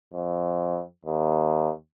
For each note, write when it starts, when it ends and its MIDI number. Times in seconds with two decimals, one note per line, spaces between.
0.14 0.81 41
1.05 1.71 39